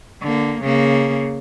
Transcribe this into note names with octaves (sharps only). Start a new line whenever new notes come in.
D3 A#3
C#3 A#3